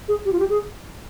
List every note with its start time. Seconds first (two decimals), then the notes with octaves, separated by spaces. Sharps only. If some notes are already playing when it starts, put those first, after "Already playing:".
0.08 G#4
0.25 G4
0.32 F4
0.39 G4
0.50 G#4